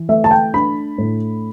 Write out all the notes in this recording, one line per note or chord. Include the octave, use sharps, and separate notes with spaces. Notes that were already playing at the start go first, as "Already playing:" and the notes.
Already playing: E3
A3 E5
A5
G5
D4 B5
A2